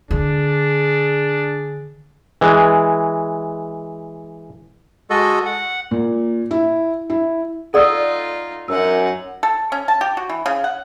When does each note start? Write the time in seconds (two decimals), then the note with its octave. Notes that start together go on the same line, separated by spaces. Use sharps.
0.11 D3 D4 G#4
2.41 E3 G#3
5.10 G#3 F#4 A4 D#5
5.46 F#5
5.91 A#2
6.51 E4
7.10 E4
7.74 D#4 F4 A4 D5 F#5 D#6 E6
8.68 F#2 D#4 F#5 E6
9.43 A4
9.72 C#4
9.88 A5
10.01 G4
10.17 F#4
10.30 E3
10.46 C#3
10.64 F#5